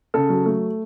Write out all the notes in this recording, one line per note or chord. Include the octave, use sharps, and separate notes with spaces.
C#3 A4
F#3
A3